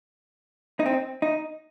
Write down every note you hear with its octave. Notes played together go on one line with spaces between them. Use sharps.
D#4
C4
D#4